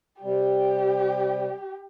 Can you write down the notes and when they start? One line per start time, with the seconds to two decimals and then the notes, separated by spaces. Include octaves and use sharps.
0.22 C3 G3 G4